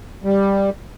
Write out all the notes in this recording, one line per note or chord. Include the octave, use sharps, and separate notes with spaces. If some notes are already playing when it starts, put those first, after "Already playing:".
G3